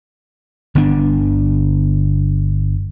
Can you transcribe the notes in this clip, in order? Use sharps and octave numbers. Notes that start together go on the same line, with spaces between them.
G1 D3 B3 D4